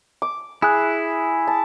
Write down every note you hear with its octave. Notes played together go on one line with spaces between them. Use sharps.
D6
E4 G#4 F#6
A5